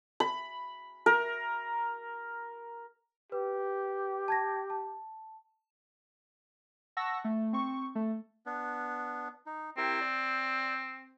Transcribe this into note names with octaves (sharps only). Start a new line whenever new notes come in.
B5
A#4
G4 B4
A5 G#6 A#6
A5
F#5 A5 C#6 E6 A#6
A3
C4 C#6
A3
B3 D4
D#4
C4 E4 G4 A#4
D5